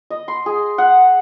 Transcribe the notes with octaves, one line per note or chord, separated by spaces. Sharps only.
D#5
C6
G#4
F#5